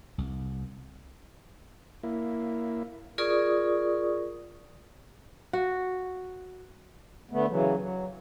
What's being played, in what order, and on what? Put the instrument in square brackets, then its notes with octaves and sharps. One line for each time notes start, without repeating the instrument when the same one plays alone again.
[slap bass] C2
[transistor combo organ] A#3 E4
[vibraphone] F4 G#4 A#4 D5 C#6 D#6
[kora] F#4
[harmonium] D3 A3 B3
C#3 E3 F#3
F#3